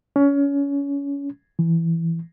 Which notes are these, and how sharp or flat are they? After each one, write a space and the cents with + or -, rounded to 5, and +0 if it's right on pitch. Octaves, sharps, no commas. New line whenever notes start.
C#4 +25
E3 +10